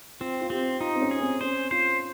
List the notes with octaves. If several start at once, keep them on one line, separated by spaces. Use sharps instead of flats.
C4 F4
F4
C4 G4
D#4 F4
C4
C#4
G#4
C4
C#4 C5
F4 C5